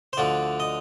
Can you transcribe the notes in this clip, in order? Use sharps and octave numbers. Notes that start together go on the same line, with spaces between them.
C5
D2 D3 F3 D5
D#5